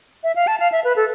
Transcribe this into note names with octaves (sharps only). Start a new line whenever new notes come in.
E5
F5
A5
F5
E5
B4
A4